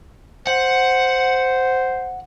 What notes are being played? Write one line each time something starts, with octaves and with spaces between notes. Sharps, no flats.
C5 F#5